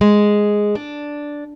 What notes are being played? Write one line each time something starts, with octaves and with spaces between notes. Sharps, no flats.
G#3
D4